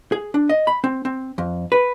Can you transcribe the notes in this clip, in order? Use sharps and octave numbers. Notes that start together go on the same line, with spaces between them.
G#4
D4
D#5
B5
C4
C4
F2
B4